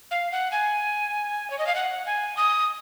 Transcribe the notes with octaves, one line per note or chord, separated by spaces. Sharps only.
F5
F#5
G#5
C#5
D#5
F5
F#5
G#5
D#6